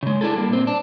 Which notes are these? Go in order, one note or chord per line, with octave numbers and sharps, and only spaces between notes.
C#3 G#3
D4 E4 G#4 A4
G3 A#3
A#2 C4
D4